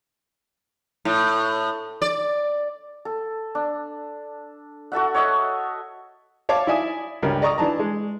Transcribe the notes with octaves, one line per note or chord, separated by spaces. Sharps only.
A2
D5
A4
D4
F#4 A4 E5 F#5
C#5 D#5 E5
C#5 F5 A5 D6
E4 D5 E5 G#5 D#6
C#2 G2 A#4
D5 D#5 A#5 C#6 D#6
E3 D4 A5 A#5
G#3